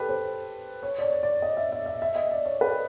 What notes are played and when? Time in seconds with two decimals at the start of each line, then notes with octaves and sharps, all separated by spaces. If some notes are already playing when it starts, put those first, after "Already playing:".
Already playing: G4 A4 B4
0.09 C5
0.83 C#5
0.98 D5
1.02 C#5
1.23 D5
1.42 D#5
1.57 E5
1.72 E5
1.86 E5
2.02 E5
2.16 D#5
2.32 D5
2.45 C#5
2.61 B4